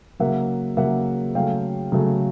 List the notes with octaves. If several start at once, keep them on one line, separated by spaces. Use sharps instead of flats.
C#3 F#3 A#3 E5 F#5
C#3 F#3 A#3 E5 F#5
C#3 F#3 A3 F5 G5
C#3 F#3 A3